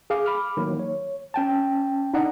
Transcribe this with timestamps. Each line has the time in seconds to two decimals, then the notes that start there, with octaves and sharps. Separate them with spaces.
0.10 G#4 F5 D6
0.26 B5 D6 F6
0.57 D#3 F#3 A#3
0.79 C#5
1.34 C#4 G5 A5
2.14 D4 D#4 D5 D#5 F#5